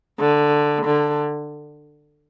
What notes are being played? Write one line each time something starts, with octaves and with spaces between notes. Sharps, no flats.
D3
D3